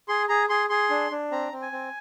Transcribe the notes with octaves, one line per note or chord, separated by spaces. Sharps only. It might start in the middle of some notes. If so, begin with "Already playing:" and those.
G#4 C6
G#4 A#5
G#4 C6
G#4 C6
D4
D4
C4 A#5
C4
G#5
C4